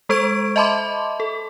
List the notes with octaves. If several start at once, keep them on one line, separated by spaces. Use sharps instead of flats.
G#3 A4 C5 C#6 G#6 D7
D#5 E5 A5 B5 C6 D6
A4